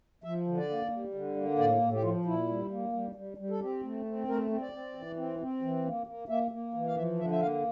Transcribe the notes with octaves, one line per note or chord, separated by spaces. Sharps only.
F3 E5
D3
D5
A#3
G3
D3
A#3
A2 D5
A2
G4
F3 F4
A#2 E4
G3
A#3
G3
G3
G3
A4
C4 G4
A3
C4
A3 A#4
C4
D5
C4
E3
C4
C4
E3
A#3
A#3
A#3 E5
A#3
E3
F5
F3 E5
D3 E5
E5
A#3 F5